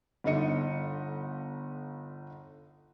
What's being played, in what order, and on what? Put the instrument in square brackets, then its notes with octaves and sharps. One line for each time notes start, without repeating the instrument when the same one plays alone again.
[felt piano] G1 D3 D#4 D#5 C#7